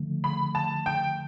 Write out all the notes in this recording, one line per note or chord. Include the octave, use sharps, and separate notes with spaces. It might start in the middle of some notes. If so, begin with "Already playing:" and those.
Already playing: D3 F3 A3
B5
A5
G5